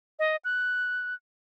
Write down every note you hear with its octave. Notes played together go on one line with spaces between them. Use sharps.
D#5
F#6